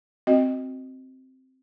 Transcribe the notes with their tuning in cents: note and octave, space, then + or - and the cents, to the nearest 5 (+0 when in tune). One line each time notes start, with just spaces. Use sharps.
C4 +0 F#4 +0 D#5 +0